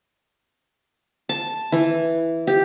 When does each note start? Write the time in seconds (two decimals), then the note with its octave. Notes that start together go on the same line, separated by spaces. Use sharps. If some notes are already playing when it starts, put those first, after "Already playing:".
1.29 A5
1.72 E3
2.47 G4